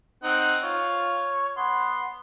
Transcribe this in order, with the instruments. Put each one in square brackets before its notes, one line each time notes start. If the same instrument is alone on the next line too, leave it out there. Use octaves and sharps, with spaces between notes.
[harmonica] C4 D#4 F#5
[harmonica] F4 [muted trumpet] C#5
[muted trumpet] B3 [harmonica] C6